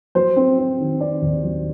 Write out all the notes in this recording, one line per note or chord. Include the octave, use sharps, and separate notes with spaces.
F#3 C5
C4
C4
D#3
C4 D5
D#2
F#3